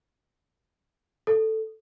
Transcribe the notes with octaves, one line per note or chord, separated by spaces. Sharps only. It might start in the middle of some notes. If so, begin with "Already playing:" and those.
A4